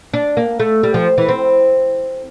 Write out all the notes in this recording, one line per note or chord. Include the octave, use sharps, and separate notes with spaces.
D4
A#3
A3
G3
F3
E3
C4